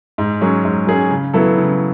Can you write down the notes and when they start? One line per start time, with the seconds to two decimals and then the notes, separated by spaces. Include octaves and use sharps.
0.18 G#2
0.41 F#3 C#4 G#4
0.65 G#2
0.87 F#3 C#4 G#4
1.11 C#3
1.34 F#3 B3 E4 A4
1.58 C#3